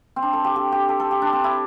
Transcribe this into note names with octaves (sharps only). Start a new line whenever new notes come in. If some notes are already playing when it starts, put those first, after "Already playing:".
C4
D4
A4
G4
G4
G4
A4
A4
G4
D4
C4
E4